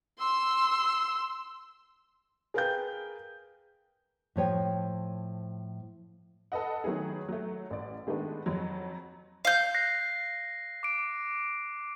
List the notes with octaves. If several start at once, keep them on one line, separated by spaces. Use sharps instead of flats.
C6 E6
G#4 A#4 B4 F5 G5 G6
A2 F3 C#5 G5
A4 B4 D#5 F#5
D#3 F#3 A3 B3 G#4
F#3 A3
A1 D5
D#3 G#3 A3 B3 D4
F2 F#3
F5 G6
F#6 A#6 C7
D6 D7